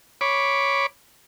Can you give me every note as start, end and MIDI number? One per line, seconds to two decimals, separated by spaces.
0.21 0.86 73
0.21 0.86 83
0.21 0.86 86